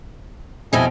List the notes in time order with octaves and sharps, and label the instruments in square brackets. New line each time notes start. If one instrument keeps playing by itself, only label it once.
[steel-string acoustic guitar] F2 B2 G3 [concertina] E4 D#5 G#5